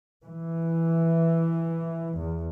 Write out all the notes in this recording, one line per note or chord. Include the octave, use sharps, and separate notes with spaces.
E3
E2